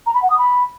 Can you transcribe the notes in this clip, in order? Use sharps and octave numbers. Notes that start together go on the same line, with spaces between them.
A#5
B5
F#5
D#6
B5